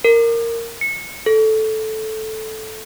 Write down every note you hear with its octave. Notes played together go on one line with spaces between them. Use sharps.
A#4
C#7
A4